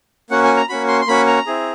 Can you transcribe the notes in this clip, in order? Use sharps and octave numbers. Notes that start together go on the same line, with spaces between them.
A#3 C#4 F#4 F#5
G#5
A#5
A#3 C#4 F#4 B5
C6
C6
A#3 C#4 F#4 B5
A#5
C4 E4 G#4